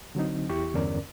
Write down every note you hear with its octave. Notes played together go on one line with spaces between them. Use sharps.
D3 F#3 C4 D#4
E2 E4 G4 C#6
E2 G2 D3 C#4 A#4 D5